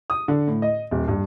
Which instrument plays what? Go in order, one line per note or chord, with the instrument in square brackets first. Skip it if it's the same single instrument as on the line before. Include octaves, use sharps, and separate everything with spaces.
[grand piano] D#6
D3
A2
D#5
D#1
G2